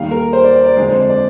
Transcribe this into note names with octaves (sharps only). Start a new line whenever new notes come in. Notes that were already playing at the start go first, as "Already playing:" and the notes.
Already playing: D#2 D#3 G3 F5
A#4
C5
D5
D5
D5
F2 D3 G#3 G#4
C5
D5
D5